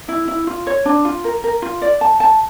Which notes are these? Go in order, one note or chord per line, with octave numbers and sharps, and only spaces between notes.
E4
E4
F4
C#5
D4
F4
A#4
A#4
F4
D5
A5
A5